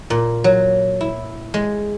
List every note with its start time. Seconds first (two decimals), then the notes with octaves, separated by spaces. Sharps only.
0.10 A#2
0.44 F#3
1.01 E4
1.54 G#3